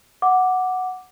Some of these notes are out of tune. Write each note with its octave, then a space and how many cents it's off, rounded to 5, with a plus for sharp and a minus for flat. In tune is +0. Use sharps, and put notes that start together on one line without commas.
F#5 +0 D6 +0